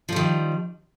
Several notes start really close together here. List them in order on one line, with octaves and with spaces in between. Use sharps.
F3 G3 D#3